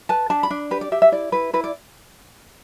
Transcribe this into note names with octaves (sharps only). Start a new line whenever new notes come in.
B4 A5
D4 A5
B5
D4
G4 B4
D5
G4 E5
E5
E4 D5
E4 B4
E4 B4
D5